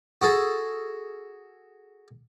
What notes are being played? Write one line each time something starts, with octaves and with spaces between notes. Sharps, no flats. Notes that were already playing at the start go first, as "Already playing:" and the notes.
F#4 G#4 A4